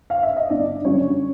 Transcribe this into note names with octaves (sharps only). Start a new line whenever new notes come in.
F5
E5
D#5
G1 D4 D5
F#2 D3 G3 C#4 C#5